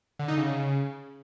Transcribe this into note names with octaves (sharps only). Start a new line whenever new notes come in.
D3
D#4
C#3